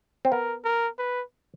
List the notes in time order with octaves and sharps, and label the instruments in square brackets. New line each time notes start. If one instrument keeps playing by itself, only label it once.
[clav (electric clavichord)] C4
[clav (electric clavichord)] B3 [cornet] A#4
[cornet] A#4
B4